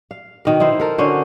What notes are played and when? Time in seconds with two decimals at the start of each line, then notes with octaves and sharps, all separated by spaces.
0.11 F5
0.45 B2 D#3 A#4
0.60 D#4 E4 C5
0.80 A4 A#4
0.98 D3 C#4 F#4 C5